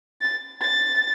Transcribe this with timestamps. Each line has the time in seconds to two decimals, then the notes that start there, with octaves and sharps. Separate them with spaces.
0.21 A6
0.62 A6